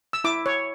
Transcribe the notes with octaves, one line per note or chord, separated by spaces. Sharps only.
E6
E4 D6
C#5